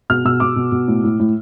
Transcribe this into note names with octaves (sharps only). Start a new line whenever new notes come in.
B2 F6
B2 E6
B2 D6
B2
B2
A2
A2
A2